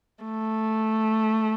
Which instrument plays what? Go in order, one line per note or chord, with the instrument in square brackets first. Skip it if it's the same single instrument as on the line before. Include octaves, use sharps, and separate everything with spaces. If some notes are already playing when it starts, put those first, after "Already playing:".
[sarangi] A3